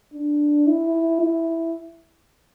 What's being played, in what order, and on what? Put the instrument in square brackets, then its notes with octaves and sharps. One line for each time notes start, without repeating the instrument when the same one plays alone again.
[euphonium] D4
E4
E4